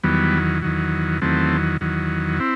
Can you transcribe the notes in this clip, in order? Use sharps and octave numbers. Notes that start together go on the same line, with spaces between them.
E2 D#3 F#3 G3 B3
E2 D#3 F#3
E2 D#3 F#3 A3 C4
E2 D#3 F#3
C4 E4